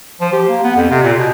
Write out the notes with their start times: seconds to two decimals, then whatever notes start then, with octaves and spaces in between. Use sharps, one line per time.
0.21 F3
0.33 G4
0.49 A#3
0.64 B3
0.76 F2
0.90 C3
1.04 A#2
1.18 B2